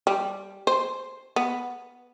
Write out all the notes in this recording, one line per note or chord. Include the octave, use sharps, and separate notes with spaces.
G3
C5
B3